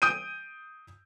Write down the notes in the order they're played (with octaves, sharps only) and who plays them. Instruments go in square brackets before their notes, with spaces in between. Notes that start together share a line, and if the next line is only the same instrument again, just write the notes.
[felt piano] D#6 G6 D7 D#7